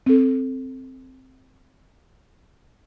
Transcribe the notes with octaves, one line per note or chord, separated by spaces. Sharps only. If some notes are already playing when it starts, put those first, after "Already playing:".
C4 A4